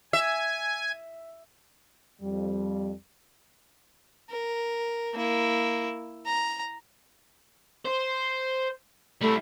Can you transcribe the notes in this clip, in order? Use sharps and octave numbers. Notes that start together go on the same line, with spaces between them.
E5 G#5
F2 G3
A#4
A#3 E4
A#5
C5
G3 A3 E4